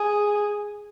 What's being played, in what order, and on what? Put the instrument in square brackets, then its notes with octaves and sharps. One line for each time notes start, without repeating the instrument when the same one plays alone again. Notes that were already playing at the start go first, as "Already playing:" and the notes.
Already playing: [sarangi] G#4